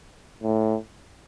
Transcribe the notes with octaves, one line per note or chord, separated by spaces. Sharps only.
A2